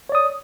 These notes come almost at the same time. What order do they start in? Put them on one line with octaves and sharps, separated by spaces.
C#5 D5 D#6